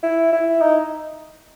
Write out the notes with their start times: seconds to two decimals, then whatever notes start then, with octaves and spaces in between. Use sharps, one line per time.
0.03 E4
0.33 E4
0.61 D#4